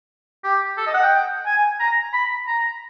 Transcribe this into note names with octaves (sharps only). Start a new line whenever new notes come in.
G4
A4
D#5
F#5
G5
G#5
A#5
B5
A#5